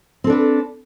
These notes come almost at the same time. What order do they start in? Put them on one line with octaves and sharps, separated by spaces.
C4 A4 D4 B4